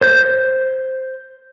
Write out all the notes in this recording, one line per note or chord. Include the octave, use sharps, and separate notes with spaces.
C5 G6